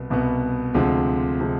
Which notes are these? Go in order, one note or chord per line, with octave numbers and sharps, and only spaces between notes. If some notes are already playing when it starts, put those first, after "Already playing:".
Already playing: C2 B2 B3
C2 B2 B3
D2 C3 F3 G#3
C3 F3 G#3